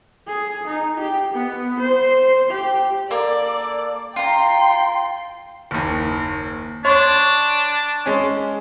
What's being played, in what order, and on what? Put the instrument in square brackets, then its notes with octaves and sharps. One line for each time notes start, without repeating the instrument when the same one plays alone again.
[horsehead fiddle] G#4
D#4
G4
B3
C5
G4
[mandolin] A#3 A4 [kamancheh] D5
[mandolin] F4 A#5 [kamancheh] G5 C6
[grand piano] F#1 D#2
[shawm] D4 [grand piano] C#5 C6 C#6
[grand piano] G#3 C#4